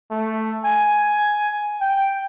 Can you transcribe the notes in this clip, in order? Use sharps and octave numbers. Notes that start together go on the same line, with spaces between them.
A3
G#5
G5